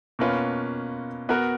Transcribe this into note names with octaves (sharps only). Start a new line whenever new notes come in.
B2 A#3 C#4 F4 B4
B3 F#4 A#4